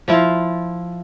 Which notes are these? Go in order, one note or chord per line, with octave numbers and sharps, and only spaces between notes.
F3 E4 F4